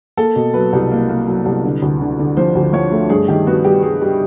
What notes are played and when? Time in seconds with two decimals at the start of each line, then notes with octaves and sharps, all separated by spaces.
0.17 A#3 A4
0.36 B2
0.54 F#3 B4
0.73 C2
0.91 A#3
1.09 A#3
1.27 F#3
1.46 C2
1.64 D3
1.82 D2
2.01 D3
2.19 D3
2.37 F3 C5
2.55 D2
2.73 F3 C#5
2.91 A3
3.10 G2 G#4
3.28 D#3 G4
3.47 B3 F#4
3.64 G3 G4
3.83 G3 G#4
4.02 G3